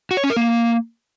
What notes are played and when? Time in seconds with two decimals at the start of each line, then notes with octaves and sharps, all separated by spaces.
0.11 F#4
0.17 C#5
0.24 C#4
0.30 A#4
0.36 A#3